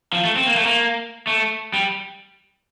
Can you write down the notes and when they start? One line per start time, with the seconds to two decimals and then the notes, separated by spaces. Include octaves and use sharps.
0.13 F3
0.24 A3
0.36 C4
0.46 A#3
0.56 A3
0.65 A#3
1.27 A3
1.73 G3